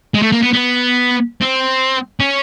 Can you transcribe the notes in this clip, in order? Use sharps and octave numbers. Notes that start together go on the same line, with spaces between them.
G#3
A3
A#3
B3
B3
C4
C#4